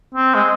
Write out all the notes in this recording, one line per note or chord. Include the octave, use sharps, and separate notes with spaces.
C4
G#3